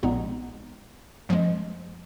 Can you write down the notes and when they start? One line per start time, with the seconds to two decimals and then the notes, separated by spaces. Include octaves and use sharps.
0.03 A#1 A#2 G#3 B3 D#4
1.29 F#2 F3 G#3